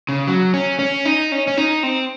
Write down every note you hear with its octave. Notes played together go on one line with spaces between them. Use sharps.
C#3
F#3
C#4
C#4
D#4
C#4
C#4
D#4
C4